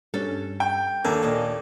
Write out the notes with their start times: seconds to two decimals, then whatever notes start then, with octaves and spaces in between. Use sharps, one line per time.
0.14 G2 C#4 G4 A4
0.60 G5
1.04 D#2 A#3 D4 A4 A#4 G#5
1.23 A#2 D#5 A5